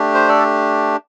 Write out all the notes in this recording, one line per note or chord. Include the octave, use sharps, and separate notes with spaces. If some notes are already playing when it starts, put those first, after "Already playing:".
Already playing: A3 D4 G4
C5
A4 D5